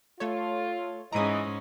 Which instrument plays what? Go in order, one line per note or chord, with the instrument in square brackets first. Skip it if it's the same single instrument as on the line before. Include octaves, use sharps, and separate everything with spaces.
[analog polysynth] A3 A4 C#5 [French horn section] F4
[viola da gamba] G#2 G#3 C#4 [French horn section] E3 D#5 [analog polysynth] A#5 D#6